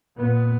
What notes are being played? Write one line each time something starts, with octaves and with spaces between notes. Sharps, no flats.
A#2 B3